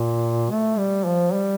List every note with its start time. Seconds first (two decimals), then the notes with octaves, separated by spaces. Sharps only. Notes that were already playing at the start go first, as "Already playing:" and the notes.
Already playing: A#2
0.51 A3
0.78 G3
1.06 F3
1.34 G3